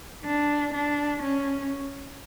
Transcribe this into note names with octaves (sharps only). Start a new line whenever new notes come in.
D4
D4
C#4